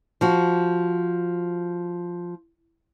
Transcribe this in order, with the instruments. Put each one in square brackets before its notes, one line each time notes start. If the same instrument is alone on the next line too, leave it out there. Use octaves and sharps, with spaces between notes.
[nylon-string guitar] F3 F#4